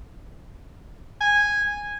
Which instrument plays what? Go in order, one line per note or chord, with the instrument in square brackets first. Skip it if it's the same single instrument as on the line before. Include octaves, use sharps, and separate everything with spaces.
[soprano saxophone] G#5